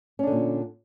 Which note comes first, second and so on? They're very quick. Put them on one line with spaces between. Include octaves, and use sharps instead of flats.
C#4 D4 D3 A#2